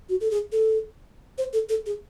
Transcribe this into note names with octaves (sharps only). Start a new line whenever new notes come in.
F#4
A4
G#4
A4
C5
A4
A4
G#4